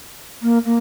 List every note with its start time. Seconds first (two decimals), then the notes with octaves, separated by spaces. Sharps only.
0.42 A#3
0.65 A#3